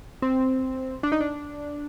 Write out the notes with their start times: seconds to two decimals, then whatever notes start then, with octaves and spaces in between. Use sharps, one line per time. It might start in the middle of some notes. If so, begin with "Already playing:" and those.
0.22 C4
1.03 D4
1.12 D#4
1.20 D4